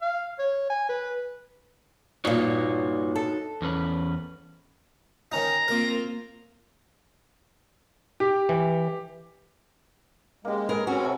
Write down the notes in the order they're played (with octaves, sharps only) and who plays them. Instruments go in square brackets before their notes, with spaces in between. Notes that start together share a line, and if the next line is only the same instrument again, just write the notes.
[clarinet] F5
C#5
G#5
B4
[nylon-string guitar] G2 A#2 [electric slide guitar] D#4 F#4 C#5
[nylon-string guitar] A4
[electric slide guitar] E2 C#4 B4
[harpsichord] D#3 C#4 D#4 [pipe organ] A#5
[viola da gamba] A#3 C4 F4 [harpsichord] A#4 D6
[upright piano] G4
[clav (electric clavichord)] E3
[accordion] G#3 [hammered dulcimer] A#3 C#4 G4
[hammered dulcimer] G#4 B4 [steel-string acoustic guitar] A#4
[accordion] C4 C#4 [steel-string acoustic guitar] F#4
[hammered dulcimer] C3 F#3 A4